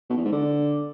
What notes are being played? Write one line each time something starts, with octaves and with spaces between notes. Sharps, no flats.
B2
E2
G#2
D3